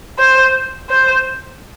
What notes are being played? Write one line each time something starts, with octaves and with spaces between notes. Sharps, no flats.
C5
C5